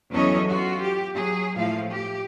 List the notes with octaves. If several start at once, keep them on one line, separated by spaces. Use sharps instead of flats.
E2 F#3 C#4 A4 C#5 D#5
F4 F#4
G4
F#3 G#4
A2 F3 F5
G4